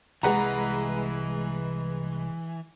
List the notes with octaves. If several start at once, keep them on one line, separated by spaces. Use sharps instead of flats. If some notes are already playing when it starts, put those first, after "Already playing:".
C2 E3 G#3 B4 F#5 A#5